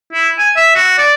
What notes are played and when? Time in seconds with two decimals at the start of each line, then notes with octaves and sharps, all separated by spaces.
0.13 E4
0.39 G#5
0.56 E5
0.75 F#4
0.98 D5